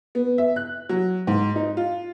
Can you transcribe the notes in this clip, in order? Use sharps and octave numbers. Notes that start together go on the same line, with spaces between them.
B3
E5
F#6
F#3
G#2
D#4
F4